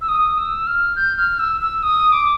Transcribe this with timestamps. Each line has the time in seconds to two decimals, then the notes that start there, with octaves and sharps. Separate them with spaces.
0.01 E6
0.08 D#6
0.38 E6
0.67 F6
0.96 G6
1.17 F6
1.39 E6
1.61 E6
1.83 D#6
2.12 D6